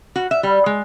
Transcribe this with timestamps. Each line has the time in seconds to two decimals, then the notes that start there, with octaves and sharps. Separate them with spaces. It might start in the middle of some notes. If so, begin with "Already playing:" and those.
0.16 F#4
0.31 E5
0.43 G3
0.66 G#3